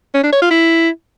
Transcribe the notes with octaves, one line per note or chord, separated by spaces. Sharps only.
C#4
D4
C#5
F4
E4